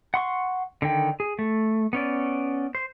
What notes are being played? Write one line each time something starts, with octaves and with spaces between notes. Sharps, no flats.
F#5 C6 C#6
D3 D#3 G5
G#4
A3
B3 C#4 D5
C5